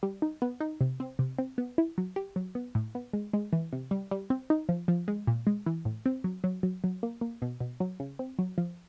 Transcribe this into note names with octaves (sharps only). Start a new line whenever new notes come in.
G3
D#4
B3
D#4
C3
C4
C3
C4
B3
E4
F#3
G4
F#3
B3
A2
B3
G#3
G#3
E3
C3
G3
G3
C4
D#4
F3
F3
G#3
A#2
G#3
E3
A2
C4
F#3
F#3
F#3
F#3
A#3
A#3
B2
B2
F#3
C#3
C4
F#3
F3